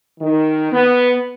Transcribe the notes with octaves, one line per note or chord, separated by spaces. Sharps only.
D#3
B3